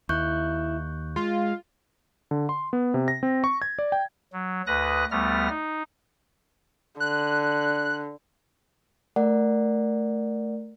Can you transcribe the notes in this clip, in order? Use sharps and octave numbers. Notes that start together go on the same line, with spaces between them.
D#2 E4 C#6 F#6 G6
G#3 F4
D3
C6
B3
C3
A#6
C4
C#6
G#6
D5
G5
F#3
D2 B4 D#6 F#6 A#6
D2 G3 A3 B3 F6 A#6
D#4
D3 F#6
A3 A#4 D5 F#5